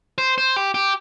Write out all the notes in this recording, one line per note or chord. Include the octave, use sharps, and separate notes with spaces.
C5
C5
G4
G4